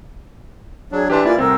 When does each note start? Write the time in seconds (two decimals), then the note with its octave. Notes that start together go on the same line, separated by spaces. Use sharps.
0.92 F#3 D4 G#4
1.10 E3 D4 G4 B4 A5 C6
1.25 A#3 E4 F4 D5 G#5
1.38 C2 A2 C4 A#4 C5 E6